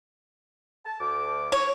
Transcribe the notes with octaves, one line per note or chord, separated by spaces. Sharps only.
A5
D2 D6
C#5